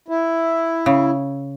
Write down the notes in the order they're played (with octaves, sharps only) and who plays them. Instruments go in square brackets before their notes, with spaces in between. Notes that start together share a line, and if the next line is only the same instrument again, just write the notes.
[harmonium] E4
[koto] C#3